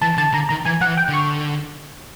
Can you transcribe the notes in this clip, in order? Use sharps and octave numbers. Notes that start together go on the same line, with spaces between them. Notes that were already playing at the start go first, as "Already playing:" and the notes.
E3 A5
D3 A5
D3 A#5
D#3 A#5
E3 G#5
F3 F#5
E3
G5
D3
C#6